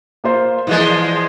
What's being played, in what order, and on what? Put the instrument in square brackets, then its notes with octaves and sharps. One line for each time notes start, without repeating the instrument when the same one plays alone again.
[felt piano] A#3 F4 C5
[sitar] A#2 F3 G#3 [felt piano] E3